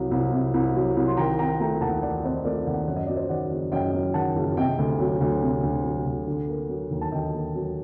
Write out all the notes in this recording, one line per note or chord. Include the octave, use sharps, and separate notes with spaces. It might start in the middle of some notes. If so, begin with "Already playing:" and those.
Already playing: C2 C3 F#3
C2
C3
C2
F#3
C2
C6
D#3 G5 A#5
C4 G5 A#5
A3 G5 A#5
D#2 F#5 A5
D#3 D5 F#5
C4 C5 D#5
A3 A#4 D5
D#2 D5 F#5
F#2 F#5
D#5
F#3 D5
C5 D#5
D#3 D5 F#5
F#1
F#2 D#5 G5
F#3
D#3 F#5 A5
F#1
C3 D#5 G5
D2
F#3
D2
C3
D2
F#3
D2
D3
A#3
F#3
D#2
A5
D3 D#5 G5
A#3
F#3